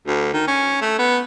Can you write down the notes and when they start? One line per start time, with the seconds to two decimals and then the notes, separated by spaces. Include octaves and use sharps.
0.07 D2
0.33 D#3
0.47 C#4
0.81 A3
0.99 B3